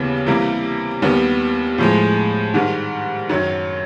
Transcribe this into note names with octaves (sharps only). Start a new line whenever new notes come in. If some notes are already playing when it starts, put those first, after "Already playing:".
Already playing: D#2 C#3 E3 G3 B3
C3 E3 G3 A#3
D#2 D#3 G3 B3
A2 F3 G#3
G#2 D#3 G3
F#2 D#3 F#3